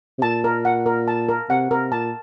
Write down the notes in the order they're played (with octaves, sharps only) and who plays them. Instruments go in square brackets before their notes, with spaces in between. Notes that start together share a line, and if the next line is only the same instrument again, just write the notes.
[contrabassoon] C3
[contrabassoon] A#2 [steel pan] A5
[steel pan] A#4
F#5
A#4
A5
A#4
[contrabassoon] C3 [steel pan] F#5
[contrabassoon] C3 [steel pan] A#4
[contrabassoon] A#2 [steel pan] A5